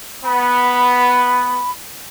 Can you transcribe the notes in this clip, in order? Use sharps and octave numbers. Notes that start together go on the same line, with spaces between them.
B3 B5